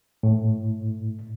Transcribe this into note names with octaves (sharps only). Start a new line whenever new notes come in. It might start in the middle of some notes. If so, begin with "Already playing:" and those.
A2